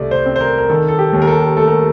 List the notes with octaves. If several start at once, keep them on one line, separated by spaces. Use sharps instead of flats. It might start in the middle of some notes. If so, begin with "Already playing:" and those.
Already playing: C2 A3 D5
C5
C4
C5
A#4
A#4
D#3 A4
A4
G4
D#2
A#4
A4
A3 A4
A#4